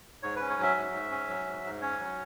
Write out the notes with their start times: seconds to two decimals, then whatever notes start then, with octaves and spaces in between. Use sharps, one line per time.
0.23 G#2 C#5
0.36 C#4 B4
0.50 C#5
0.58 F#3
0.63 E5
0.76 G#2
0.93 G#2
1.11 C#4
1.29 F#3
1.46 G#2
1.64 G#2
1.82 C#4 C#5
1.99 F#3